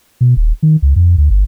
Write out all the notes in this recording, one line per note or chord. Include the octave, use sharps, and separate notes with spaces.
B2
D#1
D#3
C#2
F2
D2
G1